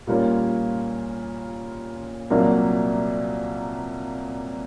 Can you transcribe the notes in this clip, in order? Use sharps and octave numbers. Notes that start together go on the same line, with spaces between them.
A#2 G3 A#3 C#4 F4
C2 A#2 F#3 A#3 D4